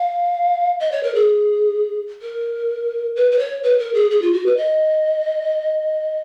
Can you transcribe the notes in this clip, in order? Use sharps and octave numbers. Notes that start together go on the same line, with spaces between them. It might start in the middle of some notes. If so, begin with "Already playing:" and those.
Already playing: F5
D#5
C#5
A#4
G#4
A#4
B4
B4
C#5
B4
A#4
G#4
G#4
F4
F#4
B4
D#5